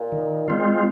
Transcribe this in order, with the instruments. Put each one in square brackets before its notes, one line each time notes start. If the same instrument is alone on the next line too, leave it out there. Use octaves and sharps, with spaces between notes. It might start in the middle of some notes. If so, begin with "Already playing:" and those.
Already playing: [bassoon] A#2
[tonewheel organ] D#3
G#3 C4 F4